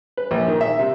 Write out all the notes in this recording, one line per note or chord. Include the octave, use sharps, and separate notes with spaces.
B4
A#1
D#3
E5
C3